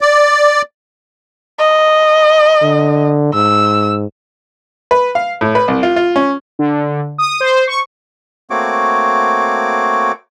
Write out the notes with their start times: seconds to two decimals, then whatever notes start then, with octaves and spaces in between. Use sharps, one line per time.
0.01 D5
1.58 D#5
2.62 D3
3.34 G#2 E6
4.91 B4
5.15 F5
5.41 A2
5.55 B4
5.68 C2
5.83 F4
5.96 F4
6.16 C#4
6.59 D3
7.18 D#6
7.40 C5
7.67 C#6
8.50 A3 A#3 C4 F#4 C#5 D6